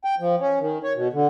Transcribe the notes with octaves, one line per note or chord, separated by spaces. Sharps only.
G5
F3
C#4
D#3
C#5
B2
D3